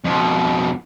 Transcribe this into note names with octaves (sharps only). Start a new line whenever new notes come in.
F2 B2